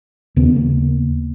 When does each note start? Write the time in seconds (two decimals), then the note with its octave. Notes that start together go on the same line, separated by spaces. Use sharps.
0.36 D#2 C#3 B3
0.56 A#3